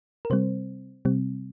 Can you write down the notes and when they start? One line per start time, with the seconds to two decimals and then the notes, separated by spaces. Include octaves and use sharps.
0.25 A#4
0.30 C3 G3 C4 C5
1.05 C3 G3 C4